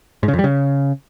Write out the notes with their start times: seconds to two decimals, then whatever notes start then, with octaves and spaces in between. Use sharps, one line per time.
0.23 G#2
0.28 C#3
0.33 F2
0.39 G3
0.44 C#3